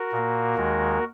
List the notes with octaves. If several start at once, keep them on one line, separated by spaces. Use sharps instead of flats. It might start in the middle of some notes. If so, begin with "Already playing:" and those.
Already playing: F#4 A#4
A#2 A#3
D#2 D#3 G#3